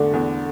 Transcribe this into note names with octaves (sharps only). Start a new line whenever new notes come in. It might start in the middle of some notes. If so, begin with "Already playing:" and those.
Already playing: E2 D3 A3 D4
E2